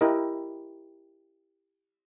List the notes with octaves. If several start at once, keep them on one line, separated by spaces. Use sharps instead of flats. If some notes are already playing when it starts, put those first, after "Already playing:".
E4 G4 A#4 D#5